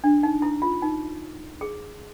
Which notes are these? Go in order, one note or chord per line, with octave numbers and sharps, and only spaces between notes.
D4
D#4
E4
F4
D#4
G#4